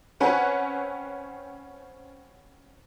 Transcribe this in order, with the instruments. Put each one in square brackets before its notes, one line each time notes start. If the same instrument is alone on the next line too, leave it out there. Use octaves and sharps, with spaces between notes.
[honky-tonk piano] C4 C#4 B4 F#5 G#5